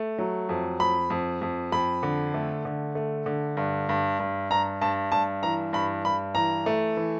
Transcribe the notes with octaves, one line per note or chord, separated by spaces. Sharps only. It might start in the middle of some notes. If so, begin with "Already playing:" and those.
Already playing: A3
F#3
F2
F2 B5
F2
F2
F2 B5
D3
A3
D3
A3
D3
G2
G2
G2
G2 A#5
G2 A5
G2 A5
E3 A#5
G2 B5
G2 B5
E3 A#5
A3
E3